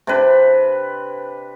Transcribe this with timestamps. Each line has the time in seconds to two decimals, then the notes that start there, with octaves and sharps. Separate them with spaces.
0.07 C3 D4 B4